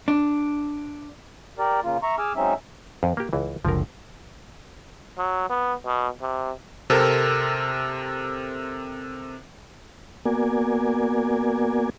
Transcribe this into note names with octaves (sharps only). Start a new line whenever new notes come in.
D4
G4 A#4 D5
C#3 A#3 F4
E5 A#5 C#6
G#4 G#5 D6 E6 F6
F#3 G#3 C4 C#4 D#4 E5
F2
A#3 G4
C#2 E3
F#1 C#2 D3 F3 A#4
F#3
B3
B2
C3
C3 C4 A4 A#4
A#3 B3 F#4 A#4 D5 G#5